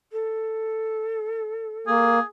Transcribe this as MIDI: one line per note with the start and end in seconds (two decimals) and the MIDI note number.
0.12 2.10 69
1.87 2.19 58
1.87 2.23 68